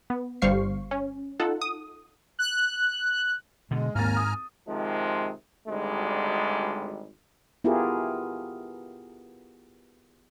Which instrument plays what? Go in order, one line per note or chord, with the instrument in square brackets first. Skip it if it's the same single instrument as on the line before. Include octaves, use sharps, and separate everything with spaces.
[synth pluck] B3
G1 G3 C5 F5 C#6 C7
C#4
D#4 F4 A4 F#5
D#6
[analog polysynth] F#6
[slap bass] B2 D3 [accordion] G#3
[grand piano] G#1 D#2 A6 [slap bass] G#2 [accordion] G#5 A#5 F6
[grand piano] D#6
[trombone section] C3 D#3 F3 G#3
G#1 D2 G3 G#3
[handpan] B3 E4 F4 G4 G#4 A#4